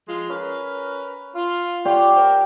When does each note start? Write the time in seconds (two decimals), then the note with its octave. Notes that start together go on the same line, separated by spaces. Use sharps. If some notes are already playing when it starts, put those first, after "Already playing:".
0.09 F3 G#3 F4
0.29 C#4 A#4 B4
1.35 F4
1.85 B3 C#4 F4 G4 D5
2.16 A#4 C5